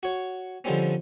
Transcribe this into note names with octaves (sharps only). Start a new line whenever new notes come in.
F#4 C#5
D3 F3 G3 G#3 C4 C#4